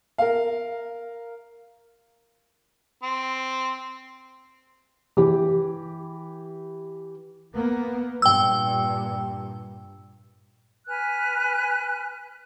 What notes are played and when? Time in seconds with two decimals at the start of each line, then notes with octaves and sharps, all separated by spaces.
0.18 A#4 F5
3.03 C4
5.17 E3 G4
7.54 A#3 B3
8.22 G2 A#2 G5 E6
10.87 B4 G#5 F6 F#6